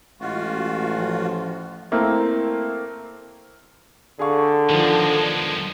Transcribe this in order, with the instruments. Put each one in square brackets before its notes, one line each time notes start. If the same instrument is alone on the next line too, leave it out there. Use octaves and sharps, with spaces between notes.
[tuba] A1 [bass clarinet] G#3 [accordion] F4 F#4
[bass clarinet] F3
[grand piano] A3 A#3 C4 E4
[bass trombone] D3 [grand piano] G#4 F5 C#6
[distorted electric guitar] B1 G#3 [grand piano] D#3 F3